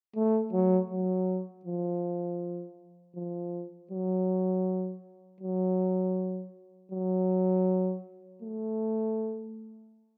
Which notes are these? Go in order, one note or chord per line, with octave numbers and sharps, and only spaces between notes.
A3
F#3
F#3
F3
F3
F#3
F#3
F#3
A3